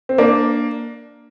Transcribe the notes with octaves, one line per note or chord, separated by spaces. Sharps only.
C4
A#3 D4